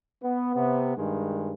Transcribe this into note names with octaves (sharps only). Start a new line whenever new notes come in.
B3
C3 B3
G2 D#3 G#3